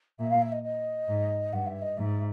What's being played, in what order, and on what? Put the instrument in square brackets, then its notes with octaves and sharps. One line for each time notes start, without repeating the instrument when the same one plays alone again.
[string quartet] A#2 [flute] E5
[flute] F5
E5
D#5
D#5
[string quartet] G#2
[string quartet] G2 [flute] F#5
[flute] E5
D#5
[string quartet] G#2 [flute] E5